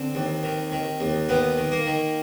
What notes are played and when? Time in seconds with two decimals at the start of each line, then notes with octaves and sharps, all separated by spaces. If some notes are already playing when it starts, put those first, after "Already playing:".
Already playing: D3 C4
0.15 D#2
0.43 D#3
0.72 D#3
1.00 D#2
1.29 D#3 B3
1.57 D#3
1.72 A#3
1.86 D#3